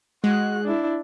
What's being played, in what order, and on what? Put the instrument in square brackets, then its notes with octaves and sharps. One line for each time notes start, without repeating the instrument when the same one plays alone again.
[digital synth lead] G#3 [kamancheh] F#4 F#6
[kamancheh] D4 E4